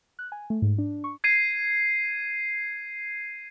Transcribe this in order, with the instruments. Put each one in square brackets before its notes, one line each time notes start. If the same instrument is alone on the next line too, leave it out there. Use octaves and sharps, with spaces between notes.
[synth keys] F#6
G#5
A3
G#2
D4
C#6
[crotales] G#6 C7 D#7